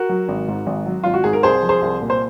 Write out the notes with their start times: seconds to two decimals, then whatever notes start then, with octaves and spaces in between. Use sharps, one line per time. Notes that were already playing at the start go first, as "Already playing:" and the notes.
Already playing: F#4 A#4
0.09 F#3
0.28 G#1
0.48 G#2
0.67 G#1
0.86 F#3
1.04 G#1 F4
1.14 F#4
1.24 G#2 G#4
1.33 A#4
1.43 C2 G#4 C5
1.63 F3
1.69 G#4 C5
1.82 C2
2.02 A#2
2.10 C5